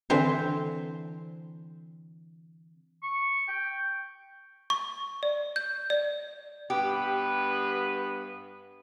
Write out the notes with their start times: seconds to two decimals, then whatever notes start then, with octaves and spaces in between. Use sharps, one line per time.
0.10 D3 E3 C4 C5
3.03 C#6
3.48 G5
4.70 C#6
5.23 D5
5.56 G6
5.90 D5
6.70 G2 B3 G4 B4